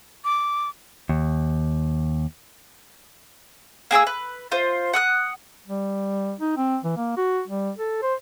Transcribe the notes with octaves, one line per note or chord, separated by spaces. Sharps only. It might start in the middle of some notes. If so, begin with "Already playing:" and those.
D6
D#2
A#3 G#4 G5 E6
B4
F4 C5
F#5 D#6 F#6
G3
D#4
C4
E3
A#3
F#4
G3
A4
C5